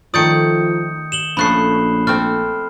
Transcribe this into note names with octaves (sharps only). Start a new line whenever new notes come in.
D#3 F3 A3 D5 D#6 G6 C#7
E7 F#7 G7
A#1 F3 A3 C#4 B5 F#6 C7
A3 C4 F6